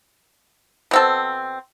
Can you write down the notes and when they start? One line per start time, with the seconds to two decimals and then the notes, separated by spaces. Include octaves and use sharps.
0.91 B2 C4 A4